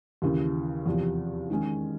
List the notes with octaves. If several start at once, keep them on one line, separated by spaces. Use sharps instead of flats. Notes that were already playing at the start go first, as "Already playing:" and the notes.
D#2 C#3 E3
E2 C3 F3
D#3 G#3 C#4